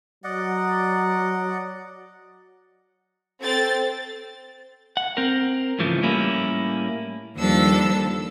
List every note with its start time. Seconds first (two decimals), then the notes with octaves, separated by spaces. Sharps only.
0.24 F#3 D5 D#5 F#5
3.42 C4 A4 A6
4.97 F#5
5.17 C4 A#4
5.79 G#2 C#3 E3 F3 A3
6.02 A2 G3 A#3 C#4 E4
7.36 D#2 F3 G3 D4 A4 E6